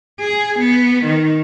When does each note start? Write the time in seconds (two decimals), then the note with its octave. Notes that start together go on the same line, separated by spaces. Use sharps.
0.21 G#4
0.59 B3
1.06 D#3